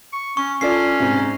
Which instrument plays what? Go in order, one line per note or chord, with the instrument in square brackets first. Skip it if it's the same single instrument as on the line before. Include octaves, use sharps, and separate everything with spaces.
[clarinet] C#6
[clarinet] C#4 [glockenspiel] C#6
[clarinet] C#4 [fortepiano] F4 A4 D5 [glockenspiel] C7
[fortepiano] G#2 C3